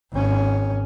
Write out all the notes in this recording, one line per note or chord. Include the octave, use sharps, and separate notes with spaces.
G#1 C#4